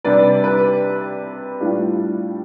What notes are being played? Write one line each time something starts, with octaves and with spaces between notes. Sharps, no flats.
C3 G3 D4 B4 D5
B4
A2 G3 D4 F4